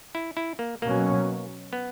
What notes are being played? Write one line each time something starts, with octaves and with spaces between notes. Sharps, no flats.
E4
E4
A#3
B2 F#3 A#3 C#4
B3